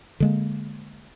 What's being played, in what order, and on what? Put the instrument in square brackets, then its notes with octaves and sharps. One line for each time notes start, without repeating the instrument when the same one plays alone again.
[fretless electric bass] D3 G#3 A#3